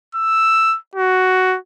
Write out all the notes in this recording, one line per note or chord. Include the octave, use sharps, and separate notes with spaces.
E6
F#4